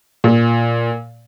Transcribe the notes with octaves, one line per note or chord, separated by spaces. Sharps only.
A#2